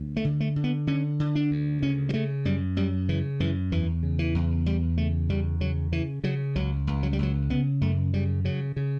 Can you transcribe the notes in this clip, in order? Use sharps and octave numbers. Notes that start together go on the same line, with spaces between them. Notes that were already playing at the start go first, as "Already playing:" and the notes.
Already playing: D2
A3
D3
A3
D3
B3
D3 C#4
D3
D4
D2
C#3 C#4
G3
C#3 A3
F#2 G3
F#2 G3
C#3 E3
F#2 E3
E2 E3
C#3
E3
E2
E2 G3
C#3 A3
E2 G3
C#3 F#3
C#3 E3
C#3 F#3
C#2 F#3
C#2
F#3
G3
C#2 F#3
C#3 B3
F#2 A3
C#3 G3
C#3 F#3
C#3